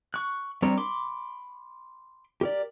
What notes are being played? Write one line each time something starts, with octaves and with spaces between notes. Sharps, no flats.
C#6 F#6
G3 C4 D4 A#4 C#5
B5 C6 D6
G4 A#4 D5